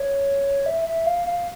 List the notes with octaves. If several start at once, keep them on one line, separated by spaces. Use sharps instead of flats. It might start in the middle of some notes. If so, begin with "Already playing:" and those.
Already playing: C#5
E5
E5
F5
F5